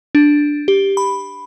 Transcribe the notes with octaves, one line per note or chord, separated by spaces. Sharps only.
D4
G4
B5